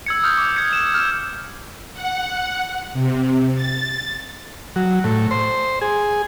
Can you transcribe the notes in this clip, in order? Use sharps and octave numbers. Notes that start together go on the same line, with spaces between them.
E6 G#6 C#7
D#6 F6 G6
D6
G#6 C#7
E7
F6
F#5
C3
A6
F#3
A2
C5
G#4